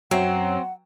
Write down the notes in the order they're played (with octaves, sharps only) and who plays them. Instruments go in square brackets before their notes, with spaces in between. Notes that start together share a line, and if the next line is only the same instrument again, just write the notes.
[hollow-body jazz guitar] F#2 C#5 E5 [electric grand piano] F#3 [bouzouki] C4 [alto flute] F#5